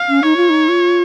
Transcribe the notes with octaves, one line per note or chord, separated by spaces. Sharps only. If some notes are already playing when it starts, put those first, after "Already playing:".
Already playing: F5
C#4
D#4 C#5
F4
D#4
F4